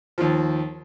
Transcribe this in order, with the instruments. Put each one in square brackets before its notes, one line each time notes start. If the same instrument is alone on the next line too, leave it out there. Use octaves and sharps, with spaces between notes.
[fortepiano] D#2 F3